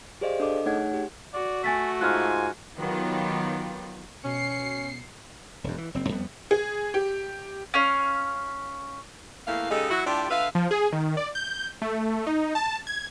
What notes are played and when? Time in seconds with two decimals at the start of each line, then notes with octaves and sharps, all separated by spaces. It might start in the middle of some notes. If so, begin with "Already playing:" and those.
0.21 G4 G#4 C5 D5 D#5 F5
0.40 D4 A4 D#5 D6
0.66 A3 D#4 G#4 C#5 F#5 G#6
0.93 G4
1.34 F#4 D5
1.64 A3 G#5 A6 B6
2.01 G#2 F4 G#5 F6 F#6
2.77 D#3 F#3 B3 F4 G4
4.24 B2 C#4 C7 C#7
5.64 E1 F#2
5.78 E3
5.94 F#1 C4
6.09 F2 G3 B3
6.51 G#4
6.94 G4
7.74 C#4 F5
9.47 E2 A3 A#3 E4 F5
9.70 C#3 G#3 D#4 G4 A4
9.90 F#3 E4 F#4
10.06 A2 D4 F4 G4
10.30 D3 B4 E5 F5
10.55 F3
10.71 G#4
10.93 D#3
11.17 D5
11.35 G6
11.82 A3
12.27 D#4
12.55 A5
12.87 G#6